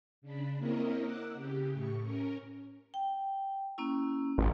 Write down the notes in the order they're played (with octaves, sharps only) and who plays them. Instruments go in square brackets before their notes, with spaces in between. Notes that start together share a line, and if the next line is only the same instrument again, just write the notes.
[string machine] C#3 D4 B5
A#3 C4 E4 A#4 C#5 D#5
F#5 D6 E6 F#6
C#3 G4
A2 C#6
C#4 A#4
[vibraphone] G5
A#3 C#4 E4
[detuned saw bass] A1